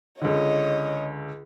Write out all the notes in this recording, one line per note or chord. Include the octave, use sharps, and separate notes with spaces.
C#2 D3 C#5 D#5